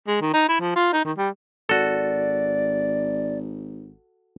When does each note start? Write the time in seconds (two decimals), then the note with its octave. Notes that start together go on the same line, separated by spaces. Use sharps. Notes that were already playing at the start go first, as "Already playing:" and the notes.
0.08 G#3
0.21 D#3
0.34 D#4
0.49 E4
0.60 F3
0.76 F4
0.93 D#4
1.05 D#3
1.17 G3
1.69 G#1 F#4 A4 D5